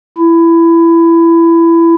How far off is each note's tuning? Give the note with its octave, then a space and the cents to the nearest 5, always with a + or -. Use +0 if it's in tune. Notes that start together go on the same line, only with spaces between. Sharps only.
E4 +20